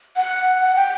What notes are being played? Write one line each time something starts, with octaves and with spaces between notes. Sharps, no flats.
F#5
G5